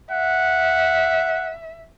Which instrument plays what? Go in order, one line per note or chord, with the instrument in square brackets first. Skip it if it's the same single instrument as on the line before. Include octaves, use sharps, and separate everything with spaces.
[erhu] E5 [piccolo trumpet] F#5